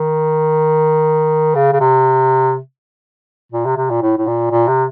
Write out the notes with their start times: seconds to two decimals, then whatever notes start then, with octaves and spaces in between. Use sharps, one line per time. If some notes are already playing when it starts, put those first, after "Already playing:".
Already playing: D#3
1.55 C#3
1.73 C#3
1.80 C3
3.52 A#2
3.65 C3
3.77 C3
3.90 A#2
4.02 A2
4.18 A2
4.27 A#2
4.51 A#2
4.68 C3